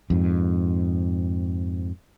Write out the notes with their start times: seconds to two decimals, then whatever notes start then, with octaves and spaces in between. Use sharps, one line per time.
0.10 F2 G#2